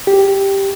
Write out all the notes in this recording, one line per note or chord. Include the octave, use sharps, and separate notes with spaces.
G4